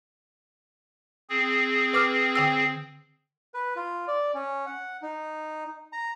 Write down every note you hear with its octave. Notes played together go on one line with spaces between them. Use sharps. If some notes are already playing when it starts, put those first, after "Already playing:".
C4 G#4
B4 D6 F6
D3 G5 E6
B4
F4
D5
C#4
F#5
D#4
A#5